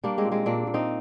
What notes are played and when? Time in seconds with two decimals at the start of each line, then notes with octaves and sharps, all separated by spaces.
0.04 G3 A#3 D4
0.18 G#3 C4
0.25 A#2
0.32 G#3 C4
0.46 A#2 A#3 D4
0.67 A#2
0.74 C4 D#4